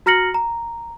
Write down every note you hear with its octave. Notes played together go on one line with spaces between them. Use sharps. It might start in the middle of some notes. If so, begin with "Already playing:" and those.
F#4 A#5 F6 A#6 C#7 F#7
A#5